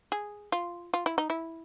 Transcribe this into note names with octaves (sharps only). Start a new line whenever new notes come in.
G#4
F4
F4
E4
D#4
E4